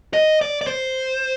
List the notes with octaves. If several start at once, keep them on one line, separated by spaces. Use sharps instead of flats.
D#5
D5
D5
C5